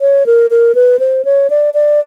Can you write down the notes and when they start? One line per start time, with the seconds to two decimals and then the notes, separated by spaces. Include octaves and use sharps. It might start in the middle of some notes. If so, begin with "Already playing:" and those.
0.01 C#5
0.26 A#4
0.50 A#4
0.75 B4
0.99 C5
1.25 C#5
1.50 D5
1.74 D5